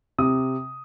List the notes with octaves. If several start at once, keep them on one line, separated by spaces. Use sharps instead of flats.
C3 D#6